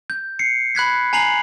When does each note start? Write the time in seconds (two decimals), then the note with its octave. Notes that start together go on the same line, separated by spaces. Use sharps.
0.10 G6
0.39 C7 C#7
0.75 B5 F#6 G#6 B6
1.13 G#5 A#5 C7 F7 F#7